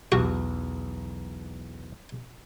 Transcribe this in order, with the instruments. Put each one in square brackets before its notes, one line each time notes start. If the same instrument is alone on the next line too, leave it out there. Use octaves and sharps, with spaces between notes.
[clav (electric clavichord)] B1 E2 [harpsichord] F#4